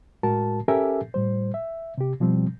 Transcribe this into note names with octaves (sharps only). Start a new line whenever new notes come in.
A2 G#3 F#4 A#4 A5
C#4 G4 A4 A#4 E5 G#5
A2 G3 C5
E5
C3 G4
B2 F3 G3 C4